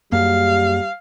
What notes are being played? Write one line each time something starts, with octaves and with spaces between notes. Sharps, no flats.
F#2 G3 A#3 F5